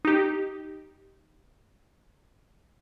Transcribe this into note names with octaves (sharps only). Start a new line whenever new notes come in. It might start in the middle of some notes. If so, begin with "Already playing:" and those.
D#4 G4